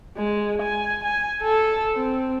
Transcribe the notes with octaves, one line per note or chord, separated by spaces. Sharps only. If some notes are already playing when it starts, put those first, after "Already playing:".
G#3
G#5
G#5
A4
C4